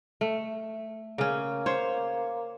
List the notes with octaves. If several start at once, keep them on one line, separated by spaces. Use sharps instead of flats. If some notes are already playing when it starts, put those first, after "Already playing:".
A3
C#3 A#3 C#4
C5 C#5